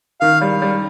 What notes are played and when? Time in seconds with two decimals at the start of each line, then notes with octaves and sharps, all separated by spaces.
0.21 D#3 F5
0.41 G3
0.62 G3